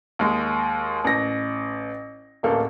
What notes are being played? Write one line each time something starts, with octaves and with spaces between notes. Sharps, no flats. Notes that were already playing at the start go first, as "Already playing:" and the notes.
D#2 G#3
A1 A#6
D1 A1 A#3 A4